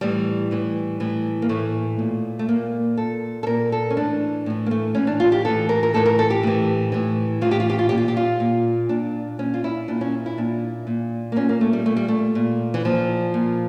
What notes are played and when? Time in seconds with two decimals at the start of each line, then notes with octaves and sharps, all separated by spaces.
0.01 A2 E3 G3
0.51 A2 E3
1.00 A2 E3
1.42 A#3
1.49 A2 E3 A3
1.99 A#2
2.39 A3
2.49 A#2 A#3
2.97 A#2 A4
3.43 A4
3.47 A#2 A#4
3.72 A4
3.90 C#4
3.97 A2 E3 D4
4.46 A2 E3
4.66 A#3
4.71 A3
4.95 A2 E3 C#4
5.07 D4
5.20 F4
5.32 G4
5.45 A2 E3 A4
5.69 A#4
5.83 A#4
5.94 A2 E3 A4
6.06 A#4
6.19 A4
6.30 G4
6.43 A2 E3
6.92 A2 E3
7.41 A2 E3 F4
7.51 G4
7.60 F4
7.70 G4
7.79 F4
7.89 A#2 G4
7.98 F4
8.08 G4
8.17 F4
8.40 A#2
8.89 A#2 D4
9.39 A#2 C#4
9.54 F4
9.64 E4
9.88 A#2 D4
10.01 C#4
10.26 E4
10.37 A#2 D4
10.87 A#2
11.32 A#3
11.36 A#2 C#4
11.49 A#3
11.61 A3
11.73 G3
11.86 A#2 A3
11.97 G3
12.08 A3
12.35 A#2
12.74 E3
12.85 A#2 F3
13.34 A#2